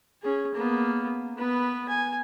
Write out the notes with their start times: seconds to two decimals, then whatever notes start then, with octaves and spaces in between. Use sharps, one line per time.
0.22 C#4 G#4
0.54 A#3 B3
1.37 B3 B4
1.89 G#5